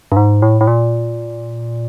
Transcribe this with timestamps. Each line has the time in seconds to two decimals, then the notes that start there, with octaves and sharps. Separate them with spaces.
0.12 G2
0.17 G#2
0.42 A2
0.61 A2
0.67 A#2